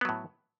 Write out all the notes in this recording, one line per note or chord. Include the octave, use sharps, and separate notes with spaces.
A2 F#3 B3